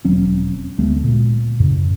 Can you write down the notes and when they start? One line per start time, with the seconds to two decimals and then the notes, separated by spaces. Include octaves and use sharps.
0.05 E1 F#3 C4 C#4
0.78 D2 G#3 A3 B3
1.04 A#2
1.60 F#2 A2 C#3